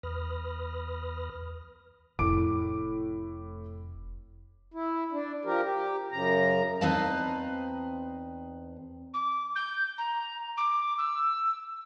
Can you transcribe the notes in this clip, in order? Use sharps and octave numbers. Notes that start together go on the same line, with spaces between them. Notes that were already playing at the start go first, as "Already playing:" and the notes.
E2 B4 B5 D#6 F6 A#6
F1 A2 D6 D7
E4
D4
F3 G4 A#4
G4
F#2 C#3 A#5
E2 C4 D#4 B4 F5 A5
D6
G6
A#5
D6
E6